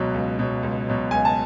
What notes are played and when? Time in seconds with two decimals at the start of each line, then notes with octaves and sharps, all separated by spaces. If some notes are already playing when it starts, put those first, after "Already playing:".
Already playing: C#2 B2 F#3
0.14 C#2
0.39 B2 F#3
0.63 C#2
0.87 B2 F#3
1.11 C#2 G#5
1.25 A5